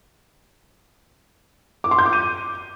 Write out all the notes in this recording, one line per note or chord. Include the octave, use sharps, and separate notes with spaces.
D6
C6
G6
D6
D#7